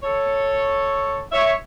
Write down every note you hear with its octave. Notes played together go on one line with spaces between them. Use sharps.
A4 C#5
C#5 E5